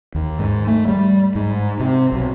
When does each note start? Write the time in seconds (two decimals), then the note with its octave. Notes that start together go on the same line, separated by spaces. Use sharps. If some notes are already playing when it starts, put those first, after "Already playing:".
0.15 D#2
0.39 G#2
0.67 A3
0.88 G3
1.35 G#2
1.80 C3
2.12 B1